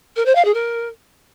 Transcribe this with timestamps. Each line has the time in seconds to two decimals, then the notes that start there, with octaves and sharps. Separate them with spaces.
0.16 A#4
0.26 C5
0.35 F5
0.45 G#4
0.54 A#4